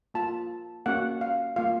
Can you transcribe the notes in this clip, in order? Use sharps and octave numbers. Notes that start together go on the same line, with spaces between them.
A#3 F4 A5
A#3 C#4 F#4 F#5
F5
A#3 F4 F5